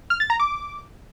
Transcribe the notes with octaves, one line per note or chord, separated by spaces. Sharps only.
F6
A6
A#5
D6